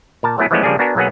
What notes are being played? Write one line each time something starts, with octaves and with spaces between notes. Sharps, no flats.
A#2 A#4 A5
F#3 A3 B3 E4 G#4 B4
E3 F3 G#3 A3 B3 C#4
C#3 F3 G3 A#3 D4 G#4
B3 D4 F#4 A#4 G#5
B1 F#3 A#3 B3 G#4 F#5